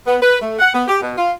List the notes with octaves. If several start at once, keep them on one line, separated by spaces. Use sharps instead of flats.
B3
B4
A3
F#5
B3
G4
B2
F4